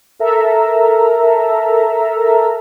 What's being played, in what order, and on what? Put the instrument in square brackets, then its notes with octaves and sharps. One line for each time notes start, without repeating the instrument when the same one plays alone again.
[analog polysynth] A4 A#4 E5 A#5